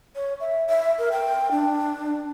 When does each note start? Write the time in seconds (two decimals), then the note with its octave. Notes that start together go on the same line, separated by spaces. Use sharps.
0.16 C#5
0.40 E5
0.69 E5
0.99 A#4
1.12 G5
1.51 D4